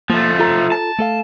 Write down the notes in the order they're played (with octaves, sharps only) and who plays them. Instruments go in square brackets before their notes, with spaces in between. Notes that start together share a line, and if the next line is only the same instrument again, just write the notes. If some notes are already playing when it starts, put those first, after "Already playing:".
[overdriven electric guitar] F3 A3 [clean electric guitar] A#3
[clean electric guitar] F4 A4 A#5
[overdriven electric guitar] A5
[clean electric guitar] A3 A4 F5